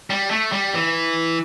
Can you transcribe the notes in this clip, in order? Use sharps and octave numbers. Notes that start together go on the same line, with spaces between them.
G3
A3
G3
E3